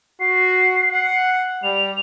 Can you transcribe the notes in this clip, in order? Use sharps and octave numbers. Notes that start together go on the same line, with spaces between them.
F#4 C7
F#5
G3 F7